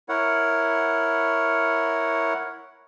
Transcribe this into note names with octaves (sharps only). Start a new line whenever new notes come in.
E4 A#4 C#5 F#5